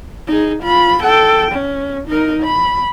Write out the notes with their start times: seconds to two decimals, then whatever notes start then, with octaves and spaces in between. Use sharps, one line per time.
0.27 D#4 G#4
0.63 F4 B5
1.03 A4 G5
1.52 C#4
2.08 D#4 A#4
2.43 B5